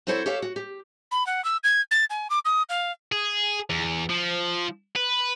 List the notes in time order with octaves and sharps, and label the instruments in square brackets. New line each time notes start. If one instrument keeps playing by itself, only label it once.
[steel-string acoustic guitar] F#3 C4 E4 A4 C5 C#5
G4 A4 C#5 E5 F5
F#4
G4
[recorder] B5
F#5
E6
G#6
A6
G#5
D6
D#6
F5
[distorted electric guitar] G#4
E2
F3
B4